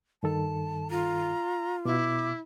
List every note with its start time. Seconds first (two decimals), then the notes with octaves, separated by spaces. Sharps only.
0.23 G2 D#3 A4 A5
0.91 F4 A#5
1.85 B2 E4 D6